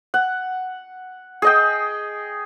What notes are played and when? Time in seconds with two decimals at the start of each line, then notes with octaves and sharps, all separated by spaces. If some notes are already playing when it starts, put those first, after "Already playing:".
0.14 F#5
1.42 G#4 D#5 G5